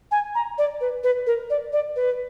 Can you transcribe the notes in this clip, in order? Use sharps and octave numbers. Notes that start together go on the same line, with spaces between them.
G#5
A#5
D5
B4
B4
A#4
D5
D5
B4